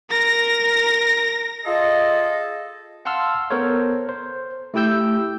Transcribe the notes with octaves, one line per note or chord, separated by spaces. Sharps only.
A#4 A#6
F4 G#4 A4 D#5
F5 F#5 A5 C6 E6 F6
B3 A4 A#4 C5 C#5
C5
A3 E4 G4 G5 E6 G6